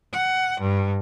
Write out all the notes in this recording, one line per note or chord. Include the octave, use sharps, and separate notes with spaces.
F#5
G2